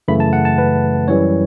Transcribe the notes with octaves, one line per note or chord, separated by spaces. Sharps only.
F#2 C#3 E3 A3 B5
A5
F#5
A5
B4
F#2 E3 G3 C#5